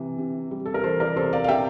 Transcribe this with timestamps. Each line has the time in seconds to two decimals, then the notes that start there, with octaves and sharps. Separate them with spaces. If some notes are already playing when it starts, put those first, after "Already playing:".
Already playing: C3 E3
0.18 C3
0.51 G3
0.66 A4
0.74 A#4
0.84 E3 A4 C5
1.00 A#4 D5
1.16 C3 A4 C5
1.33 D5 F5
1.44 F5
1.48 C3 E5 G5